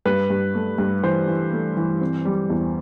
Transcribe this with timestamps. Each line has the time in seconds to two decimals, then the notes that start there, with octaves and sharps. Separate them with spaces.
0.06 G2 B4
0.30 G2
0.55 A3
0.78 G2
1.03 E3 C5
1.28 E3
1.52 A3
1.77 E3
2.01 C4
2.25 G3
2.50 E2